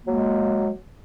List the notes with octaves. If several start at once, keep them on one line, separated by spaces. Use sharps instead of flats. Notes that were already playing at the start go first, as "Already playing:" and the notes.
F#3 G#3 A#3